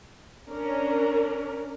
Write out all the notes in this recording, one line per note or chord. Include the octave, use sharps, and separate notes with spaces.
C#4 D4 A#4